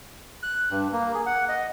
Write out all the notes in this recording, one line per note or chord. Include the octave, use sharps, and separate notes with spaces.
F#6
G2
A#3
G#4
F#5
D#5